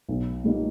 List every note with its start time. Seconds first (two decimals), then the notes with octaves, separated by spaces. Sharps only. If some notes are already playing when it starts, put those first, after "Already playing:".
0.09 B1
0.44 A#2 G3 A#3 D#4